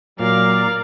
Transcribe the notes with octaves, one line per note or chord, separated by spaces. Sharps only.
A#2 F#3 A#4 D5 F5